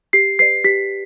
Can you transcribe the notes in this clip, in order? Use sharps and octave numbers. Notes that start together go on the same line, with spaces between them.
G4 C7
B4 D5 C7
G4 B6